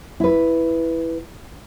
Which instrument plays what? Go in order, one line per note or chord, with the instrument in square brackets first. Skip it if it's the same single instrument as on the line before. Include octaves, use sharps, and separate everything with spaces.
[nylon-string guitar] E4 B4